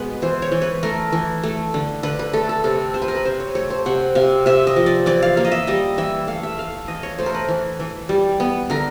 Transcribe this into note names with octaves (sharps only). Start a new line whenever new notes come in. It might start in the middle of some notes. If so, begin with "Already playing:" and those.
Already playing: B2 G#3 B3 B4
E3 C5
C#5
E3
B4
A3 A#4
E3
A3
D3
D3 B4
B4
A3 A4
A4
C3 A4
C3 C5
B4
A#4
B4
C3 C5
C#5
A3 C#5
C5
C3 F#5
C3 F5
C3 E5
D#5
F3
D5
E3 D5
F5
A#3 F5
D#5
E5
G3 D#5
E3 E5
A3 F5
E5
A3 F5
E3 D#5
C#5
A3 C5
A#4
B4
E3
E3
G3
B3
D3 A#4